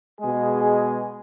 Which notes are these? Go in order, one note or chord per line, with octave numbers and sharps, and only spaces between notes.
B2 G#3 G#4
G#4